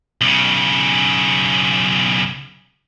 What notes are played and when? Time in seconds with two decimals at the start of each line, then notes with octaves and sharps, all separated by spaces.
0.21 B1 C#3